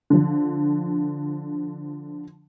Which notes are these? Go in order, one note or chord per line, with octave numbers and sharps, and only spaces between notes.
D3 F3